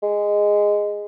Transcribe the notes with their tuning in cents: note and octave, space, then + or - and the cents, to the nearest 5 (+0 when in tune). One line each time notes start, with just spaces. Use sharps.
G#3 -10